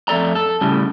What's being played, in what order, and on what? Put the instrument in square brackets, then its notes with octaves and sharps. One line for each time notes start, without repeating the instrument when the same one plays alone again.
[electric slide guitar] F2 A3 A4 D5 A#5
A4
A2 C#3 G3